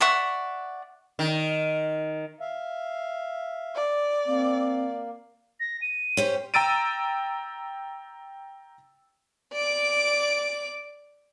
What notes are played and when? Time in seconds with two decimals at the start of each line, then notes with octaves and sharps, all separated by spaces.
0.01 D5 E5 F#5 C#6
1.19 D#3
2.40 E5 F5
3.75 D5
4.27 A#3 C4
5.60 A#6
5.82 D#7
6.17 C#4 G4 C5
6.54 G5 A#5 E6 A6 D7 D#7
9.53 D5 D6